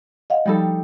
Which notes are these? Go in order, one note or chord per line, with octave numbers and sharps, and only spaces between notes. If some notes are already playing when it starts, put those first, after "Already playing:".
D#5 F5 F#5
F3 G3 D#4 A4 B5